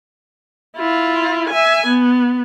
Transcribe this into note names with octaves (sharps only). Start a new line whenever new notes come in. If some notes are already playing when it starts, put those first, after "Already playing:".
E4 F4
E5 G#5
B3